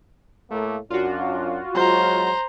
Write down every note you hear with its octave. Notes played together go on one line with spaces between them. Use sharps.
A2 A3 A#3
F#2 D4 F4 F#4
F#3 G#3 C5 A#5